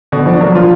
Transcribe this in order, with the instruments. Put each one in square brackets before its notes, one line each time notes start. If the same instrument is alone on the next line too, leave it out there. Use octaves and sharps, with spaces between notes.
[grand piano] B2 [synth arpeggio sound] D3
[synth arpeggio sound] F3 [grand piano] D4
[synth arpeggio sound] F#3 [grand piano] A#3
[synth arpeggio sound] F3 [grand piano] F4